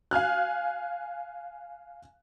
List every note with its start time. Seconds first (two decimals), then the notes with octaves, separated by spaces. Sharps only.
0.11 F5 G#5 F6 F#6